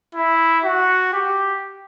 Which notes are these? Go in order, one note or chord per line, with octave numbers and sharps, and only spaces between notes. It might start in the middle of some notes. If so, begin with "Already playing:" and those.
E4
F#4
G4